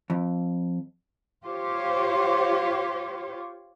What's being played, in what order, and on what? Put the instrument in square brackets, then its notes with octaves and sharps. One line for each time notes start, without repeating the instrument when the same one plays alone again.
[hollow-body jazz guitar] F2
[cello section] F4 G4 C5 C#5